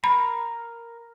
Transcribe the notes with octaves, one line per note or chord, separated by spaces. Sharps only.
A#4 A#5 B5